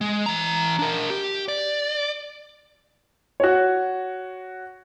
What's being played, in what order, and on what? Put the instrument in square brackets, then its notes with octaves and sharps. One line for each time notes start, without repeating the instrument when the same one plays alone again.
[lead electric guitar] G#3
E3 A#5
D4 A#4
G4
D5
[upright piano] F#4 C#5